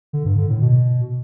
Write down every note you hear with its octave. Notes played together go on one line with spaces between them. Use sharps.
D3
G2
D3
A2
B2